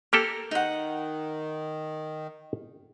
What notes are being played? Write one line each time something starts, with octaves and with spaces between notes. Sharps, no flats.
A#3 G4 A4 A#4
D#3 D#4 F#5